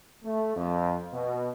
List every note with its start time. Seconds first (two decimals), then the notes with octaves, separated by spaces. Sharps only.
0.24 A3
0.57 F2
1.14 B2